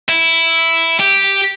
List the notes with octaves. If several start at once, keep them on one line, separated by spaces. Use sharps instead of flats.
E4
G4